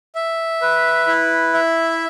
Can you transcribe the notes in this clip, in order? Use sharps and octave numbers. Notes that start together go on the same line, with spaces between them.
E5
B4
E4
E5